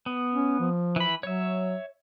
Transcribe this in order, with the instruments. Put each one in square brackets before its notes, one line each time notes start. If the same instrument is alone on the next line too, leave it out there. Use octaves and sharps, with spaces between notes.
[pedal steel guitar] B3
[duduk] C#4
F3
[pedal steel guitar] E3 B5
[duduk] F#3 [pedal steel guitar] C#5 E5